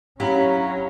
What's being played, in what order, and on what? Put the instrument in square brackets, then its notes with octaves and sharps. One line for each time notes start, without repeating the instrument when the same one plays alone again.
[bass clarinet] F#3 [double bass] C#4 [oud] E4 G4 [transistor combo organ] F5 A#5 B5